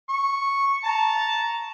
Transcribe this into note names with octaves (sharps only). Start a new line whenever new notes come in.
C#6
A5 A#5